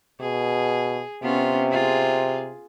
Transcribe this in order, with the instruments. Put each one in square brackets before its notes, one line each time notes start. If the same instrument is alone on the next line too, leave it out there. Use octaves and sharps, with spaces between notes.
[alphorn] B2 [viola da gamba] G#4
[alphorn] C3 [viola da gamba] B3 C#4 F4
[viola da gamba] F4 G#4